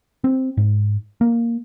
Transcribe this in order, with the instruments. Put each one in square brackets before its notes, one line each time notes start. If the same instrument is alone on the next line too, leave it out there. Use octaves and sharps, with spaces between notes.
[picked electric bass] C4
G#2
A#3